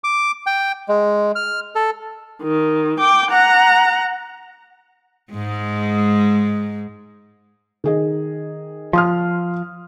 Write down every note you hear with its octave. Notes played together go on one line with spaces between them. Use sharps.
D6
G5
G#3
F6
A4
D#3
G5 D6
F#5 A#5
G#2 G#3
D#3 G#4 D#5
F3 C6 D#6 F6